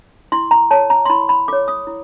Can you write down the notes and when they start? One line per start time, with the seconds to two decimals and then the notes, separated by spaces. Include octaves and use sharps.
0.32 E4 C6
0.51 A#5
0.70 A4 C#5 A5
0.90 A#5
1.05 C6
1.09 E4 B5
1.29 B5
1.48 A4 C#5 D6
1.68 D#6
1.87 E4